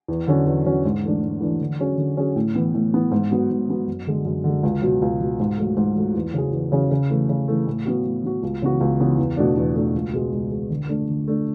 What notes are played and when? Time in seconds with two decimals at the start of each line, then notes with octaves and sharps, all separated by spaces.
0.08 E2
0.27 D3 F#3 C#4 F#4
0.46 E2
0.65 D3 F#3 C#4 F#4
0.85 G#2
1.03 E3 A3 D4
1.22 G#2
1.41 E3 A3 D4
1.61 D3
1.80 F#3 C#4 G#4
1.97 D3
2.17 F#3 C#4 G#4
2.36 A2
2.55 E3 B3
2.74 A2
2.93 E3 B3
3.11 G#2
3.31 F#3 B3 F#4
3.50 G#2
3.69 F#3 B3 F#4
3.87 F#2
4.07 D3 G#3
4.25 F#2
4.44 D3 G#3
4.63 C#2
4.82 B2 F#3
5.02 C#2
5.20 B2 F#3
5.40 G#2
5.58 F#3 A3
5.77 G#2
5.96 F#3 A3
6.15 E2
6.34 C#3 F#3 C#4 G#4
6.53 E2
6.72 C#3 F#3 C#4 G#4
6.91 C#3
7.10 E3 A3
7.29 C#3
7.48 E3 A3
7.67 A2
7.85 F#3 B3 F#4
8.05 A2
8.23 F#3 B3 F#4
8.43 C#2
8.62 C#3 E3 B3 F#4
8.81 C#2
9.00 C#3 E3 B3 F#4
9.18 E2
9.37 B2 A3 D4
9.57 E2
9.76 B2 A3 D4
9.94 C#2
10.13 B2 G#3
10.32 C#2
10.52 B2 G#3
10.70 D3
10.89 A3 D4
11.09 D3
11.28 A3 D4